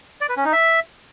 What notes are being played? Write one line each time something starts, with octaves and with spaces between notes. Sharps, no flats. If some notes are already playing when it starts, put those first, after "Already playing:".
D5
B4
C#4
D#4
E5